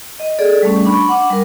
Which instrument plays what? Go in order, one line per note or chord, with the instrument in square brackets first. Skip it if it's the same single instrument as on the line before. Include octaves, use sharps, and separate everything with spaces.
[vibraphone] D#5
G#4 A4 D5
G3 A3 C#4
D4 B5 C#6
F#5 D6
G3 A#4